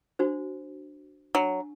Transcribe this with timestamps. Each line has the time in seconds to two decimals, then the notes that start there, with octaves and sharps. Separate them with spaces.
0.19 D4 F#4 C5
1.35 F#3 D4